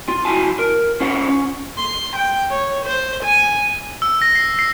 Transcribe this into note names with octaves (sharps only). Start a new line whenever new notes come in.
F4
E4 F#4 G#5 A5
A#4
C#4 F4 C5 F#5
C#4
C6
G5
C#5
C5
G#5
E6
A#6
C7
C7